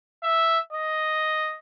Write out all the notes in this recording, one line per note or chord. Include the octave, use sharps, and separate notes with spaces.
E5
D#5